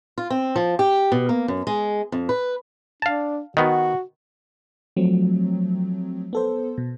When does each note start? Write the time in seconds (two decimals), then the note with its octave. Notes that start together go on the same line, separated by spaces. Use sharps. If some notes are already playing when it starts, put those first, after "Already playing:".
0.18 F4
0.30 C4
0.56 F3
0.79 G4
1.12 B2
1.29 A#3
1.48 F#2
1.67 G#3
2.12 F2
2.29 B4
3.02 D4 F5 A5
3.57 D#3 B3 F#4
4.97 F3 F#3 A3 C4
6.33 B3 A4 C5
6.78 B2